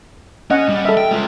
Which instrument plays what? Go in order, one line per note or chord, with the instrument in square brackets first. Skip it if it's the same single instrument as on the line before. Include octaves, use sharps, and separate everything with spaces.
[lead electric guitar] C#4 [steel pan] D#5 F#5
[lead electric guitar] G3
[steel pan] A4 E5
[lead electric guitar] G5
G#3 F4